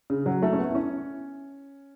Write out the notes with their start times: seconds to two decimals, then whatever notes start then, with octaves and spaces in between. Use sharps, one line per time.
0.10 C#3
0.26 F#3
0.42 A3
0.53 C#4
0.59 B3
0.69 E4
0.75 C#4